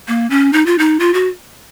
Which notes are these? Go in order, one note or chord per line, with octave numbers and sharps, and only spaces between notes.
A#3
C#4
D#4
F4
D#4
F4
F#4